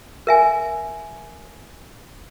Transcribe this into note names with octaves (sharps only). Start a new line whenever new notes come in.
A#4 E5 G#5